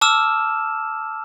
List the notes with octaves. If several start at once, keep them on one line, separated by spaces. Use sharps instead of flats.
A5 D6 E6 F6 E7